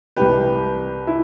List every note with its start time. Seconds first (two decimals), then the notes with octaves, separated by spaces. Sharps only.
0.16 C2 C3 E3 G4 B4
1.07 E4